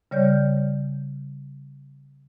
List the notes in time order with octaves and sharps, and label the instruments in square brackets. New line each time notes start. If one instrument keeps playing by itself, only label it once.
[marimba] C#3 G3 C#5 D5 F6 G6